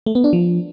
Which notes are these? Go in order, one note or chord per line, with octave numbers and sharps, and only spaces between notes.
A3
B3
D4
F3